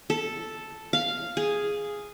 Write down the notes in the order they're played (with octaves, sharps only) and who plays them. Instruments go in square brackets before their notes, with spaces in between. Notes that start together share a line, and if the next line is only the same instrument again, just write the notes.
[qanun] A4
F5
G#4